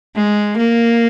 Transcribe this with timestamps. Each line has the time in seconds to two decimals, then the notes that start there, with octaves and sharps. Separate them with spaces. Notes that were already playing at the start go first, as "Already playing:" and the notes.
0.16 G#3
0.57 A#3